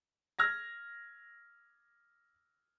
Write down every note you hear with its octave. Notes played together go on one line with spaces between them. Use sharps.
F6 G#6 A#6